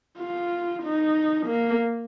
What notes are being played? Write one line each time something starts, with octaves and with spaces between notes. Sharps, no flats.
F4
D#4
A#3